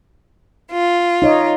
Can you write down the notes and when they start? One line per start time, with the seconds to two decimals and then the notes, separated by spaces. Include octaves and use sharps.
0.71 F4
1.22 D#4 C#5 D#5